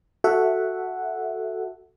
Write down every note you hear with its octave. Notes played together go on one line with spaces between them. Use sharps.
F#4 A4 E5 F#5